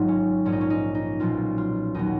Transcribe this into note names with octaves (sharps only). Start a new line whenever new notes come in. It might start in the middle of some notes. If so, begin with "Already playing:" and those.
Already playing: G#1 G#2 F#3 D#4 F4
C#4
A#1 G#2 F3 C#4
D#4
C#4
D#4
D#4
B1 A#2 F3 F4
F4
D#2 D#3 F#3 D#4